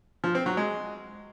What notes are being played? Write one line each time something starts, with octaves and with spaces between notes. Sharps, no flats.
F3
C4
F#3
G#3